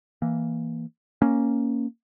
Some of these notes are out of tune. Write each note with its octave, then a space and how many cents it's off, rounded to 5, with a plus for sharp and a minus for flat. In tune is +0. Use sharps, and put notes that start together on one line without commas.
E3 +0 A#3 +0
A#3 +0 C#4 +0